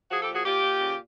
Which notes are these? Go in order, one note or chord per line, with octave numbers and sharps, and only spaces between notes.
F3 F#4 G#4
G4 A4
A#2
F#4 G#4
A#2 F4 G4
A#2
C#3